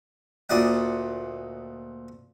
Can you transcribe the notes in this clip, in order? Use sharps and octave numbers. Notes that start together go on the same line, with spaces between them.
D2 A#2 D5 D#5 F#5